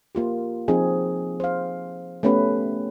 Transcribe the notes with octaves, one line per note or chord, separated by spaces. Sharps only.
A#3 F4 G4
F3 C4 D#4 G#4
C5 F5
A3 B3 C#4 G4 B4